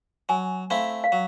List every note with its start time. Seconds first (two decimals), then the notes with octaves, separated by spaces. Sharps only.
0.29 F#3 G#5
0.70 A3 C4 E4 F5
1.04 F5
1.12 F#3